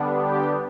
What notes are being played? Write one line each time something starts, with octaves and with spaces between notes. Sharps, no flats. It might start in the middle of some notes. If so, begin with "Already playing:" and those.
Already playing: D3 G3 B3 D4
G4